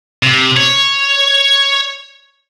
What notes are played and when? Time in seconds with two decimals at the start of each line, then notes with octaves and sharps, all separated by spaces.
0.23 C3
0.56 C#5